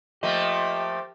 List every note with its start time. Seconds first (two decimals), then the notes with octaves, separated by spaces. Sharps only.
0.23 F3 A3 A#3 G4 D#5